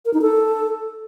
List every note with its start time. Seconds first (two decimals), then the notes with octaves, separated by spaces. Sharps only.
0.05 A#4
0.14 D#4
0.22 A4